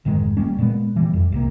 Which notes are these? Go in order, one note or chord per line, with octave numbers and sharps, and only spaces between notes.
F1 G#2 D#3 G#3
D#1 G3 A#3 C#4
A#2 G#3 A3 B3
E3 G3
F2
C2 C3 A#3